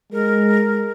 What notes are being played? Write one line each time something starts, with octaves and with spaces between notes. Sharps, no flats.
G#3 A#4